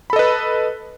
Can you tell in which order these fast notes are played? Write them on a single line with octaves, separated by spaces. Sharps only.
B5 A4 D#5 B4